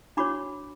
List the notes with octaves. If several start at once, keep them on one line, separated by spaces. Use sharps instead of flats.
D4 F#4 C#5 B5 D6